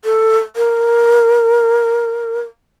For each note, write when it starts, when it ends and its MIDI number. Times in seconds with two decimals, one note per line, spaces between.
0.04 0.38 69
0.56 2.40 70